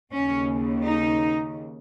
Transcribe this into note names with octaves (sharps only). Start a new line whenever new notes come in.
D#2 C#3 C#4
D#4